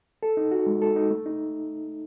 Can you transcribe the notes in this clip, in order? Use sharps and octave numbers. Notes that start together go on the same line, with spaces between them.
A4
D#4
F#4
G#3
A4
D#4
A3
D#4